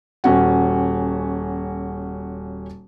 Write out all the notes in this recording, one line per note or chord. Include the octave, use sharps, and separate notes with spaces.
D#1 C#4 F#4